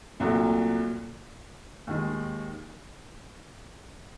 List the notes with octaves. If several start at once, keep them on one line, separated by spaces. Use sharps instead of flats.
C2 A#2 F#3 A3
D#2 D#3 G#3